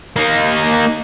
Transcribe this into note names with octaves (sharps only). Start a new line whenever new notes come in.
A#3 D#4